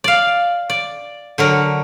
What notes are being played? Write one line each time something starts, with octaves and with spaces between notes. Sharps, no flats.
D5 F5
D5
D3 F#3 A#4